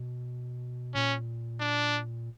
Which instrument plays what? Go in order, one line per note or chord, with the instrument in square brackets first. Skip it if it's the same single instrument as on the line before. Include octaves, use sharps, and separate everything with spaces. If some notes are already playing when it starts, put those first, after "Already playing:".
Already playing: [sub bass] B2
[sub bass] A#2 [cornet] C#4
[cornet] D4